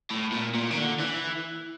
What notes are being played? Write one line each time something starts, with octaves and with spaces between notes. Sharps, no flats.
A2
A#2
A#2
D#3
D3
E3